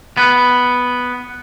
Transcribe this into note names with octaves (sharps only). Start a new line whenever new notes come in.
B3